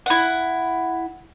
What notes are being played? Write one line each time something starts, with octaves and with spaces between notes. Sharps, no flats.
E4 F#5